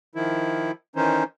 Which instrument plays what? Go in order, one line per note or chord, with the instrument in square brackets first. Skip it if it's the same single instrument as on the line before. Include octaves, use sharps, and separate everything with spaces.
[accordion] D#3 F3 E4
D#3 E3 C#4 D#4 C5